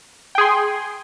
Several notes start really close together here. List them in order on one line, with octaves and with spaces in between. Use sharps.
G5 G#4 C6